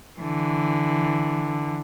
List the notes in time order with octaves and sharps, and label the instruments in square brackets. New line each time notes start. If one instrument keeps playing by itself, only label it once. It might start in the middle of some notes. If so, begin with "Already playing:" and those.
[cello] D3 E3